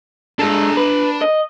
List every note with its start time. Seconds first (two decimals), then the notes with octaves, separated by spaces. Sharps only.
0.39 G#3 D4 A4 A#5
0.77 B4
1.21 D#5